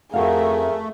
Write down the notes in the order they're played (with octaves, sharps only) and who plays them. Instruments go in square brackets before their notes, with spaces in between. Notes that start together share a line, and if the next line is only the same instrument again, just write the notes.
[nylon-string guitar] F2 F#4 F5 [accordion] A3 [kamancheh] G#4 A#4